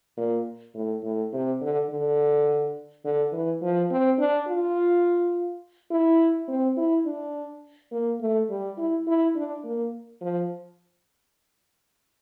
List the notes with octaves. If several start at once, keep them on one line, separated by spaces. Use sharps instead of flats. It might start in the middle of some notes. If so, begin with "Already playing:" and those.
A#2
A2
A2
C3
D3
D3
D3
E3
F3
C4
D4
F4
E4
C4
E4
D4
A#3
A3
G3
E4
E4
D4
A#3
F3